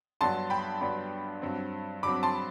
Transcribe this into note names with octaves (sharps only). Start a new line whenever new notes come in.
G2 F#3 B3 D4 A5 C6
G5 B5
G2 F#3 B3 D4
G2 F#3 C4
G2 F#3 C4 B5 D6
A5 C6